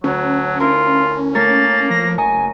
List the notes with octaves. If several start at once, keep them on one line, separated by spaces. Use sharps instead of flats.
D2 F#3 C#4
D4 E4 F4 A#4
A3 A#3 A#4 C#5 A6
F3 A#6
F#1 D#5 G#5 A#5 C#6